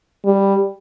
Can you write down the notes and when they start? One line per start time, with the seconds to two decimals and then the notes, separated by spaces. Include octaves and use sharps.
0.25 G3